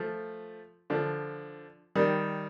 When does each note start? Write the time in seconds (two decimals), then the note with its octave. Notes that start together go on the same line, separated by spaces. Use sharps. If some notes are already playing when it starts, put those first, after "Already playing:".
Already playing: F3 A3
0.90 D3 F3
1.96 D#3 G3